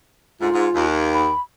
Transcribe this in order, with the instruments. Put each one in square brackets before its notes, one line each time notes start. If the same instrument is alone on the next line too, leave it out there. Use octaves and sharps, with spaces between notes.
[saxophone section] D2 G#2 [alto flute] F4
[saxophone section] G#2
D#2
[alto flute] B5